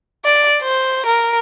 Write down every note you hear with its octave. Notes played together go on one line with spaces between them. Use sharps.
D5
C5
A#4